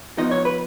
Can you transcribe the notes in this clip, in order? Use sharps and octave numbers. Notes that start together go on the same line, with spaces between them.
F3 B3 D#4 D#5
C#5
B4